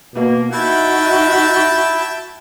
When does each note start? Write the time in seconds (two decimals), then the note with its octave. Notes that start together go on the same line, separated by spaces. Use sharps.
0.15 B2 A#3
0.53 D#4 E4 F#4 E5 G5 A5